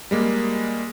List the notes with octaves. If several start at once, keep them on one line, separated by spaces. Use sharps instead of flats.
G3 G#3 A#3